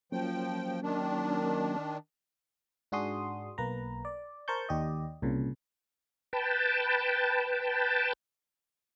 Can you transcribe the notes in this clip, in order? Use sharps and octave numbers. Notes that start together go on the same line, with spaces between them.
F3 F#3 A#3 C#4 G5
D#3 D4
G#2 D4 F#4 G#4 C6 D#6
B1 A#3 B4 A#5
D5
A#4 C5 A5 C#6 G6
D#2 G4 D5 D#5
C2 A#2 C#3
B4 G5 A5